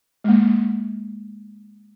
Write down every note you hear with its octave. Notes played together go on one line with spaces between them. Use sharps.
G#3 A#3